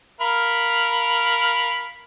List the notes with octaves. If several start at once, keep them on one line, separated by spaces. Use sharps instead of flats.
A#4 F5 B5